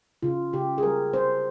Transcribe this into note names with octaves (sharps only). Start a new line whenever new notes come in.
C#3 F4
C#3 G4
G#4
G3 A#4
C4 C5